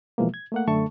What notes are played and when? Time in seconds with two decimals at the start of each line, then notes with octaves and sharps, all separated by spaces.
0.18 B2 E3 F3 G#3 A#3
0.34 G#6
0.52 A3 A#3 F#5
0.68 F#2 D3 A3 A5 C#6